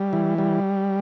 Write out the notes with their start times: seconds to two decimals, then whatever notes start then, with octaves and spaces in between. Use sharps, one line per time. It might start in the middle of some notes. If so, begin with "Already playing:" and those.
Already playing: G3
0.13 E3
0.38 G3